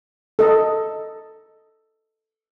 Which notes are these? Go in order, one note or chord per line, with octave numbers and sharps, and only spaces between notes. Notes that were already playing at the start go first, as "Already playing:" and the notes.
A4 D#5